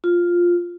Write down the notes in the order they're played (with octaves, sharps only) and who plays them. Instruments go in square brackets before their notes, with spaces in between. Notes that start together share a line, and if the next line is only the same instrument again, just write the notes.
[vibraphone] F4